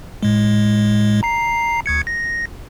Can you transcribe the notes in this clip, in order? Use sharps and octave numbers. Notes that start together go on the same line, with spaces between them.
A2 G#3
A#5 C7
D2 G#6 C#7
A#6